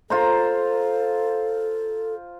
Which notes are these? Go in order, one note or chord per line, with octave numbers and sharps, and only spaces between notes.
F4 A4 C5 A#5